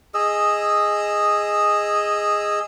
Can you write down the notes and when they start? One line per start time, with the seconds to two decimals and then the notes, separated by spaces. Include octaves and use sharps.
0.14 G#4 D#5 E6